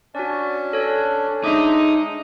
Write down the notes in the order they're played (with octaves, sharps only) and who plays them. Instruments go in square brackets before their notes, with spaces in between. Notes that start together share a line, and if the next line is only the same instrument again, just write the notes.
[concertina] C#4 D4 [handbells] F#4 D5
[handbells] A4 C#5
[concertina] G#3 D#6 [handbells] D4 E5 D6 [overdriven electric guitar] D#4